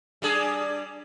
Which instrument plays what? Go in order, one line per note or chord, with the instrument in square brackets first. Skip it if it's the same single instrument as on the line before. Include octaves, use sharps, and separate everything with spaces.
[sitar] G3 D4 G#4